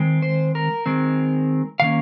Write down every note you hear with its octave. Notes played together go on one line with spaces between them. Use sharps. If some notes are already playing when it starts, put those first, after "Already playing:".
Already playing: D#3 G#3 C4
C5
A#4
D#3 G#3 C4
D#3 A#3 C#4 F5